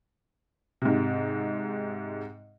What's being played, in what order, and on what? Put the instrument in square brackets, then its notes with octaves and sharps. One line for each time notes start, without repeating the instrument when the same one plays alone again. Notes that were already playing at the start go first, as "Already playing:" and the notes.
[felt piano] G#2 C3